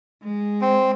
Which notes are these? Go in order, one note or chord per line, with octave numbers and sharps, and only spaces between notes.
G#3
C4